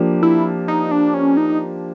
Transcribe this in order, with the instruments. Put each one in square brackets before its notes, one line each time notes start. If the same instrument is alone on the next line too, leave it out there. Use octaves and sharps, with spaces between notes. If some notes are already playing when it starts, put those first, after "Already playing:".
Already playing: [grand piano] F3 A#3 D4 G4
[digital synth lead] E4
D#4
D4
C#4
D#4